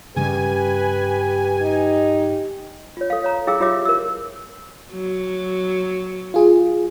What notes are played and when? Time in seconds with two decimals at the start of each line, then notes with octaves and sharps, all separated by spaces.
0.16 G2 C#3 G3 G4 B4 G#5
1.60 D#4
2.97 F4 C#5
3.10 A4 F5
3.24 C#5 A#5
3.47 E4 G#4 F5 G5 D6 E6
3.60 E4 F4 G4 C#5 E5 D6
3.85 A#4 E6
4.92 F#3
6.34 F4 G#4